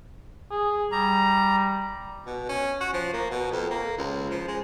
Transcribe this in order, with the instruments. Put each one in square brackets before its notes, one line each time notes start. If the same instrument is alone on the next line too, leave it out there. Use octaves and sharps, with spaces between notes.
[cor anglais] G#4
[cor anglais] G3 [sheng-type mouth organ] A#5
[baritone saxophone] B2
C#4
F#4
F3
A#3
B2
F2
A#3
C#2
F3
G#3